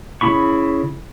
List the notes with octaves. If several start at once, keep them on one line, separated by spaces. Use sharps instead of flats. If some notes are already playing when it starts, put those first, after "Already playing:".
C#3 C#4 E4 B5 C#6